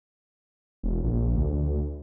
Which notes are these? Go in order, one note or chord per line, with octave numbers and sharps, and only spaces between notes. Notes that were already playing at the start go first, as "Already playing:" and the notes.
E1
A#1
D2